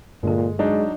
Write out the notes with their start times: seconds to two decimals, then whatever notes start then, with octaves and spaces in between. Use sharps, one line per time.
0.23 G2 A#2 D3 G#3 A4
0.59 F#3 G#3 D4 D#4